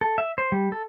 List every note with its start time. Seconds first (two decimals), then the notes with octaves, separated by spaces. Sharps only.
0.01 A4
0.18 E5
0.38 C5
0.52 G3
0.72 A4